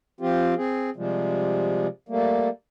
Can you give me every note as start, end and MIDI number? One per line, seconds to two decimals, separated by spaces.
0.21 0.54 53
0.21 0.54 60
0.21 0.54 65
0.21 0.54 67
0.57 0.90 60
0.57 0.90 68
0.96 1.87 48
0.96 1.87 53
0.96 1.87 55
0.96 1.87 56
2.09 2.49 55
2.09 2.49 57
2.09 2.49 58